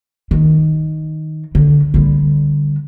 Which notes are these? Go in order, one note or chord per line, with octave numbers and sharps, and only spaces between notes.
D#3
D3
D3 G3